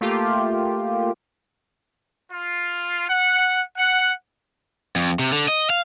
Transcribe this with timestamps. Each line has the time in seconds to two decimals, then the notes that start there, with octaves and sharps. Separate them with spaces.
0.01 A3 A#3 F4 G4
2.31 F4
3.08 F#5
3.76 F#5
4.96 F2
5.19 C3
5.32 D3
5.48 D#5
5.70 F5